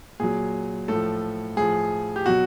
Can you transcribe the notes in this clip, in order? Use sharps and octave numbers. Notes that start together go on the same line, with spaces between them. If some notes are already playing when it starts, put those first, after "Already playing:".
A#2 F#3 G#4
A2 F3 A4
A2 F3 G#4
G4
B2 F#3 F#4